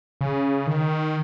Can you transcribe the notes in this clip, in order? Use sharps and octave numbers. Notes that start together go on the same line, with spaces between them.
C#3
D#3